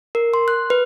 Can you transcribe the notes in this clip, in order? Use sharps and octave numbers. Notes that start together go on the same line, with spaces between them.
A#4
C6
F#6
B4